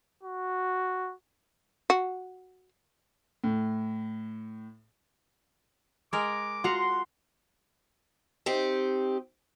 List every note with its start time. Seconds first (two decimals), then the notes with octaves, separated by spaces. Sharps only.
0.23 F#4
1.90 F#4
3.44 A2
6.13 G#3 A#4 D6
6.64 F#4 F5 F#5 A#5 C6
8.46 C4 D#4 G4